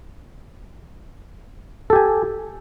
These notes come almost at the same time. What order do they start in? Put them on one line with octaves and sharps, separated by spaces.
A4 G4 G#5